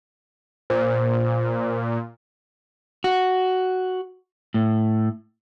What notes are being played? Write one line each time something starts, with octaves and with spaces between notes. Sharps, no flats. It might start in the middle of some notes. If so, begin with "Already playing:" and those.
A#2 C5
F#4
A2